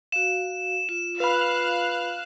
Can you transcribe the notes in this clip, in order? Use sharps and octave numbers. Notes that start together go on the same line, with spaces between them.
F#4 F5 E7
F4 E7
B4 F5 B5 F#6